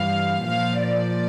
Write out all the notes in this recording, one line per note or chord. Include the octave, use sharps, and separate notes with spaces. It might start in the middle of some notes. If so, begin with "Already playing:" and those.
Already playing: G2 E3 G3 F5
A#2 F3 F5
D5